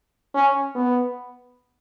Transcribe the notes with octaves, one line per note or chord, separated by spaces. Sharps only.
C#4
B3